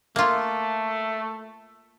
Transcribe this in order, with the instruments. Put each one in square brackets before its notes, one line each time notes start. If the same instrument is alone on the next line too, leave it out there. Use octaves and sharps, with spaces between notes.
[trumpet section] A3 [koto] A#3 F4